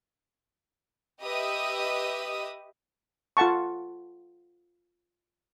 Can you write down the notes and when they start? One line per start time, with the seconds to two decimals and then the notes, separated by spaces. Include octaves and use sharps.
1.23 G4 B4 D#5 E5 D#6 E6
3.37 F4 A4 F#5 A5 C#6